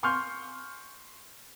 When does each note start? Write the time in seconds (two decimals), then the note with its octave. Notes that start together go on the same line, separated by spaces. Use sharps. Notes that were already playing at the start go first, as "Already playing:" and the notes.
0.03 G#5 C6 C#6 F6 G6